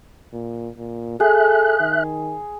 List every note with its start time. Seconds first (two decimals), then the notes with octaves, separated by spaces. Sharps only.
0.33 A#2
0.78 A#2
1.20 G#4 A4 E5 F#6
1.80 D#3